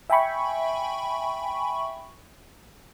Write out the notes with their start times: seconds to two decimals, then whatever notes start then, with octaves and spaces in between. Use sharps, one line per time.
0.10 E5 G5 G#5 B5 C#6